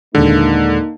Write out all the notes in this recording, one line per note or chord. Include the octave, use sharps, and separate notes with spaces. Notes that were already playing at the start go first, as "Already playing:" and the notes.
D#2 A#2 D3 G#3 A#3 D#4